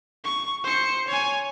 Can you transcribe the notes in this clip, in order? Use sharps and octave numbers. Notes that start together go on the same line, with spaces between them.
C#6
C5 C#7
C#5 G#5